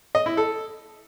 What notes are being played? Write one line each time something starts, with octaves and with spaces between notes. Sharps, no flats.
D#5
E4
A4